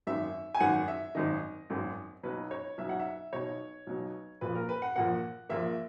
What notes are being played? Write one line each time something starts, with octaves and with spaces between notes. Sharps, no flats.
G#1 F#2 D#3 E5
G#5
G#1 F#2 D#3 F#5
E5
G#1 F#2 D#3 D#5
G#1 F#2 D#3
B1 B2 F#3 B4
C#5
B1 B2 F#3 E5
F#5
E5
B1 B2 F#3 C#5
B1 B2 F#3
A#1 A#2 A#3 B4
A#4
B4
F#5
A#1 A#2 A#3 F#5
A#1 A#2 A#3 E5